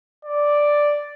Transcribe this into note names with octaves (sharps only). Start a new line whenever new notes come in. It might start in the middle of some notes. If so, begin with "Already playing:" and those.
D5